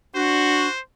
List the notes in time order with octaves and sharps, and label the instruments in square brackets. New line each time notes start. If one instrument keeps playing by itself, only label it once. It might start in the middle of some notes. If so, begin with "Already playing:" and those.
[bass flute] D4 [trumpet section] F#4 [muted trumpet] C5